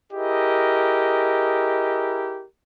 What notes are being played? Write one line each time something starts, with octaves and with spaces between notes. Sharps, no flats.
E4 G4 G#4 A#4 D#5